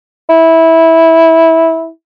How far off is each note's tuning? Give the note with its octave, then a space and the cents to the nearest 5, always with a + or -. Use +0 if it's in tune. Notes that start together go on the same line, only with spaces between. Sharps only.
E4 -15